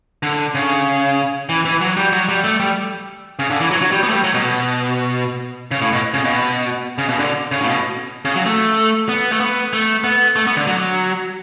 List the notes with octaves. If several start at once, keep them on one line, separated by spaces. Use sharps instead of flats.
D3
C#3
E3
E3
F#3
G3
F#3
G3
A3
G3
C#3
D3
E3
F#3
F#3
G3
B3
A3
G3
F#3
B2
C#3
A2
B2
C#3
B2
C#3
B2
D3
C#3
A2
B2
C#3
F#3
A3
B3
A3
B3
A3
B3
A3
B3
D3
F#3